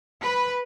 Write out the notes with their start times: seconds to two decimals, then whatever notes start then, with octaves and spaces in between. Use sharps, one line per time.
0.22 B4